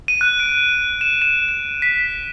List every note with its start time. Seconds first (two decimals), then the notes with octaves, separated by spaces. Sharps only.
0.08 D#7
0.21 F#6
0.40 D7
1.01 E7
1.22 E7
1.49 E7
1.82 B6